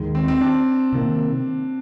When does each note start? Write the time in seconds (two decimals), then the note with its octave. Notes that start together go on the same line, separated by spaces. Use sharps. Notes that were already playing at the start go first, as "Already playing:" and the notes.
Already playing: D#2 D#3 G#3
0.15 C4
0.28 C4
0.41 D4
0.93 C3 D#3 A#3